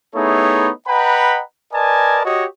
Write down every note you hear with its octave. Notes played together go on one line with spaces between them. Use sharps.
A3 B3 D#4 E4 G#4 C#5
B4 D#5 F#5 G5 A#5 B5
A#4 B4 D5 D#5 G#5 A5
F#4 G4 C#5 D#5